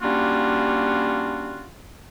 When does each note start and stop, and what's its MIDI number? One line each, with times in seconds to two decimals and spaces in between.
0.02 1.67 55
0.02 1.67 58
0.02 1.67 61
0.02 1.67 62
0.02 1.67 65
0.02 1.67 66